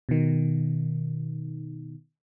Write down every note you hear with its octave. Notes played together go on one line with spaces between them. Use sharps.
B2 D#3